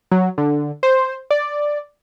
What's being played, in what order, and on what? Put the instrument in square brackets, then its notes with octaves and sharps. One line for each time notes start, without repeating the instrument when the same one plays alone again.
[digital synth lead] F#3
D3
C5
D5